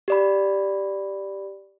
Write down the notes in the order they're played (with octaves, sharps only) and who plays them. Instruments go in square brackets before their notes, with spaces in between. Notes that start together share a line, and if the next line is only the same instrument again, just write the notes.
[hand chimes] G4 D5 B5